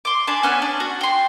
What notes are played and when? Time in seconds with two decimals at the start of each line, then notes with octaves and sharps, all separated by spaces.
0.05 C6 D6
0.27 D4 G#4 A5 B5
0.43 B3 C#4 C#5 G#5
0.62 D4
0.80 F#4
1.01 G5 C6